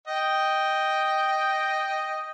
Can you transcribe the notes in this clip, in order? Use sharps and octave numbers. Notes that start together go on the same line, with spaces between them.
D#5 G5